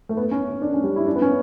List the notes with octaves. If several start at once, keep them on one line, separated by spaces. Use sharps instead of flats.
A3
B3
C#4
D4
C#4
G3
E4
D4
B3
C#4